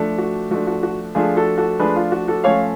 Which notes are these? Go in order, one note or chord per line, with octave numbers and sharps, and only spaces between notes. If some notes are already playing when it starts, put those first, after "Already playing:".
Already playing: F3 A3 D4
F#4
F3 A3 D4 F#4
F#4
F#4
F3 A3 D4 F4 G#4
F#4 A4
F#4 A4
F3 A3 D4 G#4 B4
F4
F#4
F#4 A4
F3 A3 C#4 C#5 F5